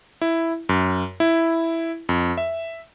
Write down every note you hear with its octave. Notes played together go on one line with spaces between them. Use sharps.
E4
F#2
E4
F2
E5